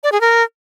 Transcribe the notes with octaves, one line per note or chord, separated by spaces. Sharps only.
D5
G#4
A#4